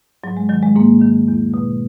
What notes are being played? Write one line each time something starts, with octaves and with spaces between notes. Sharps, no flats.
G#2 F#3
G#3
D#3 F#3
G#3
G#2 A#3
D#3
E2
B2